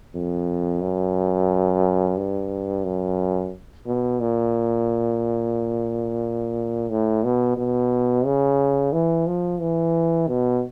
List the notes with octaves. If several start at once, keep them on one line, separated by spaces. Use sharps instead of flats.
F2
F#2
G2
F#2
B2
A#2
A2
B2
B2
C#3
E3
F3
E3
B2